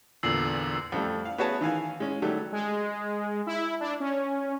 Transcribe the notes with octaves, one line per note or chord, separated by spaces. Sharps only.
E2 A#2 D3 E6 C7 F#7
F2 G3 A3
F5
B3 F#4 G#4 C#5 E5 A5
D#3 E3 F5 G#5
G#3 C#4
D#3 F#3 G3 A3
G#3
E4
D4
C#4